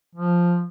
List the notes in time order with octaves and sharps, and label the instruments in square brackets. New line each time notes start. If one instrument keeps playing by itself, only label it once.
[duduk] F3